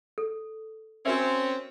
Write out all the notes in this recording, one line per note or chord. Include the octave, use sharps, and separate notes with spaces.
A4
C4 C#4 F#4 A#4 E5